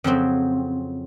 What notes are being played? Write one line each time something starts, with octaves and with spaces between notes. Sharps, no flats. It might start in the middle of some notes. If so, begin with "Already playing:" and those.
F2 C#3 F#3 C4